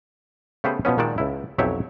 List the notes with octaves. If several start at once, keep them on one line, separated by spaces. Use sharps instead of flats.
C#3 A3 B3 G4 B4 C5
B2 F3 B3 C#4
A#2 D#3 G#3 F#4 D5 A5
C#2 E4
B1 F2 F#3 G4 C#5 E5